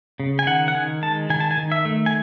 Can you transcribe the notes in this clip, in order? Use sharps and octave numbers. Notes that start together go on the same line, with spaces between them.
C#3
G#5
D#3 F#5
F#5
D#3 G#5
G#3 A5
D#3 G#5
A5
G#5
D#3
E5
A3
G#5